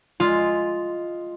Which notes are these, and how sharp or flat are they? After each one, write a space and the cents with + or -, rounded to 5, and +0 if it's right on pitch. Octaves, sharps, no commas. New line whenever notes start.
G#3 +0 F4 +0